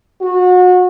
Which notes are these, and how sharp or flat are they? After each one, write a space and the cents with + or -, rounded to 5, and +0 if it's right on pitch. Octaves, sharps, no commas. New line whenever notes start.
F#4 -30